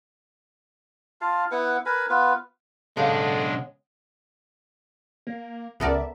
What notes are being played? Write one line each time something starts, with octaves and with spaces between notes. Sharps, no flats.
F4 F5 A5
B3 E4 B4 F#5
A#4 B4 G#5 B5
B3 F4 B4
B1 C#3 G#3 B3 D4 A4
A#3
C#2 B3 A4 A#4 D5 E5